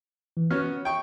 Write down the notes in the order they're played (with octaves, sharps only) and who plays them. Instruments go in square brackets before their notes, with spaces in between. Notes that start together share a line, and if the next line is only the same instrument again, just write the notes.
[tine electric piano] E3
[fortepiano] B3 C#4 F#4 [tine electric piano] F6
[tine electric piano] C#5
[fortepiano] G5 C#6